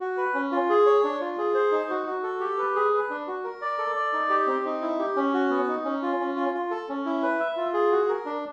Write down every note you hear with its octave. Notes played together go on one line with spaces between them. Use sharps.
F#4
B4
C#4
F4
G#4
C#5
D4
F4
G#4
C5
D#4
F#4
F#4
A4
G4
B4
G#4
B4
D4
F#4
A#4
D5
A4
D5
D#4
G4
C4
D#4
E4
G4
C#4
F#4
B3
D#4
C#4
F4
C#4
F4
F4
A4
C#4
E4
B4
E5
F4
G#4
F#4
A#4
D4